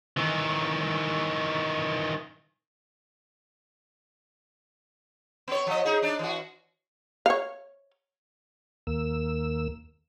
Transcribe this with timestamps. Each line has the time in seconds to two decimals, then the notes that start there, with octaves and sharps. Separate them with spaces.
0.17 D#3 E3
5.48 B3 C#5
5.67 F3 D#5
5.85 D#4 G#4
6.02 D4 D#4 D5
6.19 E3 F#4
7.26 C#5 F5
8.87 D#2 A#3 E6